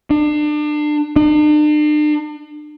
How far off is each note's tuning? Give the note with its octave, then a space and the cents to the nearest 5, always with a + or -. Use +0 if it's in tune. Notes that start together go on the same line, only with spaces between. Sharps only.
D4 +30
D4 +45